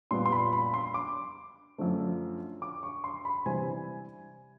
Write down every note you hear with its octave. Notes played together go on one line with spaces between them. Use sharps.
A#2 G3 B3 C6
C6
B5
B5
C6
D6
F#2 D3 F3 A3
D6
C#6
C6
B5
C3 E3 G3 C4 G#5